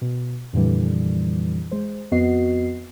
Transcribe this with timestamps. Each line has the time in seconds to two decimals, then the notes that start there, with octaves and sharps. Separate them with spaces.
0.01 B2
0.53 F2 A#2 D3 E3 G3
1.71 G#3 C5
2.11 F2 B3 F#4 D#5 C7